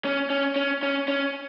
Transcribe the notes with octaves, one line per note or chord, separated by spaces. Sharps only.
C#4
C#4
C#4
C#4
C#4